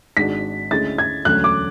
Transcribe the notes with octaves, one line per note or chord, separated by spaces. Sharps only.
G#1 G#2 G#3 D4 F#4 B6
D2 D3 G#3 C#4 E4 A6
G#6
E1 D2 D3 F#3 C#4 F#6
D6